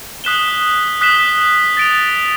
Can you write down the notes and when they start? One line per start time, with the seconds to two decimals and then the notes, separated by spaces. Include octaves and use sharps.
0.24 D#6 F#6 B6 E7 G7
1.01 D#6 F#6 B6 E7 G7
1.77 A6 D7 F7